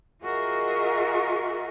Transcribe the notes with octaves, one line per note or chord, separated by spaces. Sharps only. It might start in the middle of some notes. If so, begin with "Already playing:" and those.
F4 F#4 G#4 A#4 D#5 E5